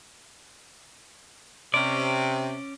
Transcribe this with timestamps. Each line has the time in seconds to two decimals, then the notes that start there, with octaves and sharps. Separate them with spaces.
1.74 C3 C#4 D5